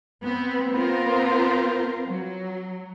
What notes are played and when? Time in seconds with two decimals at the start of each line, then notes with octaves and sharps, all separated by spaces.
0.23 B3 C4
0.73 B3 C4 F4 A#4 C5
2.07 F#3